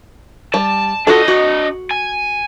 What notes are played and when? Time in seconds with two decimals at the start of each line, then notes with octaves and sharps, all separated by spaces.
0.54 G3 A5
1.07 D4 F4 F#4 A4 D#5
1.28 F#4
1.91 G#5